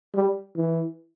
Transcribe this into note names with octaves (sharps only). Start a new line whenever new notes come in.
G3
E3